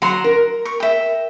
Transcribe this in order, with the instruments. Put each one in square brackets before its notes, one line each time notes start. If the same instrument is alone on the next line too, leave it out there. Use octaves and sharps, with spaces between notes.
[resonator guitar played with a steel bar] F#3 [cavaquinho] F#5 A#5 C6
[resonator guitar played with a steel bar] A#4
[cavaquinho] C#6
E5 G5